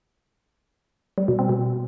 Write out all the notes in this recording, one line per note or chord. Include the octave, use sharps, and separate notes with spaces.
G3
B2
C4
B2